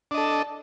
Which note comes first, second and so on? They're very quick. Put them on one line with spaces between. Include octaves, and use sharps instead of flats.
D4 D#5 A4